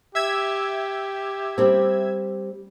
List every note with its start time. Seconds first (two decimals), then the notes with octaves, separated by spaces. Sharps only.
0.15 G4 E5 E6 G#6
1.58 G3 C4